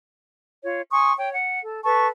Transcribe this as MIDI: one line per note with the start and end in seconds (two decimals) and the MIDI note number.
0.63 0.81 65
0.63 0.81 73
0.91 1.12 80
0.91 1.12 84
0.91 1.12 85
0.91 1.12 87
1.17 1.32 73
1.17 1.32 79
1.34 1.60 78
1.63 1.80 69
1.84 2.07 69
1.84 2.07 71
1.84 2.07 81
1.84 2.07 85